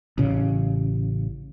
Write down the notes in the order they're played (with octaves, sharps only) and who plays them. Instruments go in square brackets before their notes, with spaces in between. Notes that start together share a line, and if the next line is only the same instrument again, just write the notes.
[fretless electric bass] A1 C#3